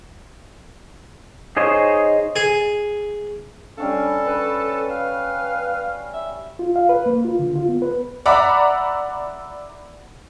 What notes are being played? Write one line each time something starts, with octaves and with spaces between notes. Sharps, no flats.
D#4 G#4 C5 C#5 D#5
G#4
G3 C#4 D4 A4 F5
B4 B5
F5
E5
F4
F5
B4
A#3
F4
D3
F4
B3
B4
D5 E5 F#5 A#5 B5 D6